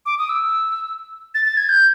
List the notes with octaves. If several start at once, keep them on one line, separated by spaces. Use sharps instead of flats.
D6
D#6
E6
A6
A6
G#6
G6